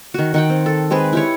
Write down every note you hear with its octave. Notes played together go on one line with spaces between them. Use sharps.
D#3 F#4
D#3 F#5 G5
C4
A4
G#3 C4 G#4 B4
E4 G4 C#5